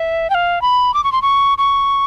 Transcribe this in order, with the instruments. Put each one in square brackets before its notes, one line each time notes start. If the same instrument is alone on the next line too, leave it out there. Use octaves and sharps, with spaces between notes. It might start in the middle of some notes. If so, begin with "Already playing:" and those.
Already playing: [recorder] E5
G5
F5
B5
D6
C#6
C6
C#6
C#6